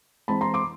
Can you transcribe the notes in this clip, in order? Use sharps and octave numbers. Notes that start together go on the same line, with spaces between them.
E3 G#3 C4 A5 B5
A#5 C6
C6 D6